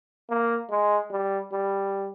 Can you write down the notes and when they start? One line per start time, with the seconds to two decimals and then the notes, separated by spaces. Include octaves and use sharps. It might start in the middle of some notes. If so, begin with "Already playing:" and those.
0.29 A#3
0.70 G#3
1.11 G3
1.52 G3